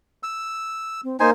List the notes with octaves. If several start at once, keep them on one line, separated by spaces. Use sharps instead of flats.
E6
C4
A#3 D#4 C5 G#5